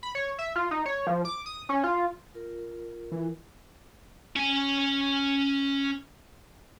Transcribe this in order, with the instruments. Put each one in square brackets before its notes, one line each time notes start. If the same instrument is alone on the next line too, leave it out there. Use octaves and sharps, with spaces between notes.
[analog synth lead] B5
C#5
E5
F4
D#4
C#5
F3
D6
D#6
C#4
F4
[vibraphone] F4 A#4
[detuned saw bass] E3
[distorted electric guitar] C#4 G#5